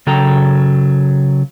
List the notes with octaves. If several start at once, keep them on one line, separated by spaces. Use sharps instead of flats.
C#3 F#3 A4 G5 A#5